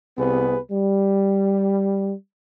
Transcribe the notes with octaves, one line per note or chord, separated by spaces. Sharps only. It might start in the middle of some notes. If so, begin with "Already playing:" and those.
C2 C3 B3 G#4 B4
G3